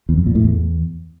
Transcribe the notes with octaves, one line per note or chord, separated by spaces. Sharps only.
E2
F2
A#2
A2
E2